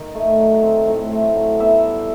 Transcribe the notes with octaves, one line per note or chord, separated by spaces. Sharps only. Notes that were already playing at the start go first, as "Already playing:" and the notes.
Already playing: D#3 D#5
A3
F#3
C4
A2
A3
F#3
B3 E5
G3